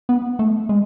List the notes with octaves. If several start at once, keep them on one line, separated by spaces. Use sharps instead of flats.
B3
A3
G#3